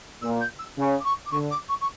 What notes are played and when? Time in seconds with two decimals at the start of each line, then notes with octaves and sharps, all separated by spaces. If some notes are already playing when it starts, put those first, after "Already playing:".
0.22 A#2 E6
0.40 G6
0.59 E6
0.77 C#3
0.99 D6
1.04 C#6
1.25 D6
1.31 D3 C#6
1.50 D6
1.68 C#6
1.81 C#6